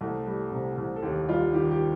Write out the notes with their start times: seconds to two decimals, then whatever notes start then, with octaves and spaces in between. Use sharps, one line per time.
0.01 C2 A3 A4
0.27 G3
0.51 C3
0.78 C2
0.96 A4
1.02 D#2 G4
1.28 G3 F4
1.54 D#3 G4
1.71 G4